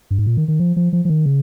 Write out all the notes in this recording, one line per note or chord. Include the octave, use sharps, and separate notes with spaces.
G2
G#2
A#2
D#3
D#3
F3
F3
F3
F3
D#3
C#3